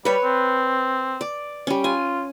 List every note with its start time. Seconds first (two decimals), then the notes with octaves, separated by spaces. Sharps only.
0.05 G3 B4 C#5
0.23 C4
1.21 D5
1.67 G3 C#4
1.84 F4 G#5